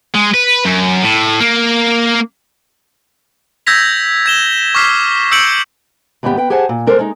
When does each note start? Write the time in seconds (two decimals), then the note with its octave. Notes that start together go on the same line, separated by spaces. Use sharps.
0.15 G#3
0.34 B4
0.65 F#2
1.03 A2
1.40 A#3
3.66 E6 G6 G#6 A#6 B6 F7
4.26 G#6 E7 G7
4.75 C#6 D6 F6 B6 C7
5.31 E6 G6 C#7 D7 F#7
6.23 D#2 G#2 G3 B3 G4
6.37 B4 G5
6.50 G4 G#4 C5 F#5 G#5 A5
6.69 A#2
6.87 G#3 A4 A#4 C5 D5
6.99 G#3 D#4